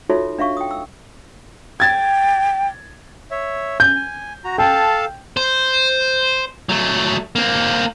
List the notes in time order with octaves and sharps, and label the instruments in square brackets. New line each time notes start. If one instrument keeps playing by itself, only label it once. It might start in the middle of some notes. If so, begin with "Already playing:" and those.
[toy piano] D#4 F4 F#4 A4 C#5 E5
D4 E5 F5 C#6
G5 D#6
E6
[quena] G5 [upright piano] G#6 A6
[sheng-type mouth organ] C#5 E5
[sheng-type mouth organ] G#5 [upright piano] G6
[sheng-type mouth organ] G#5
F#4 A#5
[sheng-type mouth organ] A4 F5 A5 [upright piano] G5
[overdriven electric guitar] C5
F#3 A3
A#3 C4